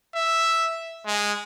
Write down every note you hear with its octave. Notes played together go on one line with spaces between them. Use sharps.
E5
G#3